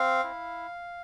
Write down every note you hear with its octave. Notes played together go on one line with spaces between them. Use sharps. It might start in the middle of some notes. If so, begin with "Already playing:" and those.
Already playing: C4 F5
E4